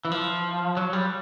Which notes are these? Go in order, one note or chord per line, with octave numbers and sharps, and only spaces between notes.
E3
F3
F#3
G3